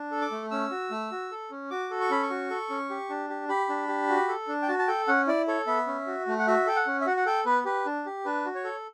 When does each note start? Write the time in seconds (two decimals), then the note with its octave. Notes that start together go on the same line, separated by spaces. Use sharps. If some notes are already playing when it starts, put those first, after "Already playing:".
Already playing: D4
0.11 A4
0.21 D6
0.31 A3
0.51 C#4 E6
0.71 F#4
0.91 A3
1.11 F#4
1.31 A4
1.51 C#4
1.70 F#4 D6
1.91 A4
2.01 C#6
2.10 C#4 B5
2.23 C#6
2.30 F#4
2.50 A4
2.70 C#4
2.90 G4
3.10 D4
3.30 G4
3.48 G4 B5
3.69 D4
3.88 G4
4.09 F#4
4.28 A4
4.48 D4
4.62 G5
4.68 F#4 A5
4.79 A5
4.87 A4 G5
5.08 C#4 F#5
5.27 E4 D5
5.47 A4 C#5
5.67 B3 E5
5.87 C#4
6.06 F#4
6.27 A3
6.39 F#5
6.47 F#4 E5
6.66 A4 G5
6.76 F#5
6.87 C#4
7.01 E5
7.06 F#4 F#5
7.17 F#5
7.26 A4 G5
7.45 B3 B4
7.65 G4 B4
7.86 D4
8.06 G4
8.25 D4 B4
8.45 F#4
8.55 C#5
8.64 A4